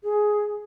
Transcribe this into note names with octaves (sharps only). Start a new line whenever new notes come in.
G#4